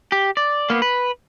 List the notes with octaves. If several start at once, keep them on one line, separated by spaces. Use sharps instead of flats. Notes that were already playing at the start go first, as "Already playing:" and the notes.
G4
D5
A#3 B3
B4